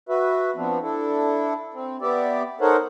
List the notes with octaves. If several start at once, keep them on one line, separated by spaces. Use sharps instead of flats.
F#4 B4 E5
F3 B3 C4 D4
D4 E4 A4
C4
B3 G4 D5 E5
D#4 A4 A#4 C5 C#5 F#5